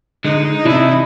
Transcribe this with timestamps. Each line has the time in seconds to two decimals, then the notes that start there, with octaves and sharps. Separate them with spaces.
0.24 D3 G#3 D#4
0.65 C3 E3 D4 E4